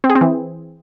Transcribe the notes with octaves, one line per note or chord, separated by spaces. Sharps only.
C4
G#4
C4
E3